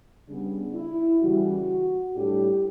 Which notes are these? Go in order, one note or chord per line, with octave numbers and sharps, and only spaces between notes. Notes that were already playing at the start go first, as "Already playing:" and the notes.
C#3 G3 B3 D4
E4
C#3 E3 G3 C#4 F#4
A2 G3 D4 G4